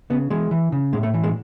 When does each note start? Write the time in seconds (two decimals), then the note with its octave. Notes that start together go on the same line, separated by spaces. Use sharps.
0.10 C#3 B3
0.30 E3 G#3
0.51 E3
0.72 C#3
0.93 A2 G#3
1.03 A3
1.14 E3
1.23 G#3